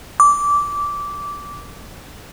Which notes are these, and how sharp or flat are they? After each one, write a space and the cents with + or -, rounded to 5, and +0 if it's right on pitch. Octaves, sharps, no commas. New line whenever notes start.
D6 -15